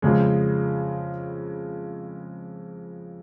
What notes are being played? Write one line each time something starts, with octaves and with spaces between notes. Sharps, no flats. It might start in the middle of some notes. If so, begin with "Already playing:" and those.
F2 C#3 G#3